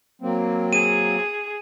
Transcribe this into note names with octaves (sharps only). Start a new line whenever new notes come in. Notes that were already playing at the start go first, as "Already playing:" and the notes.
F#3 A#3 C4
G#4 D#7